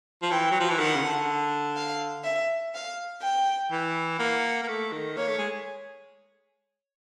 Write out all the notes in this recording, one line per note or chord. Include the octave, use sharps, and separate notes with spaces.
F3
E3 G5
F#3
F3
E3
D#3 F#5
C#3
D3
F5
E5
F5
G5
E3
A#3 F#5
A#3
A3
D#3
A#3 C#5
A3
G#3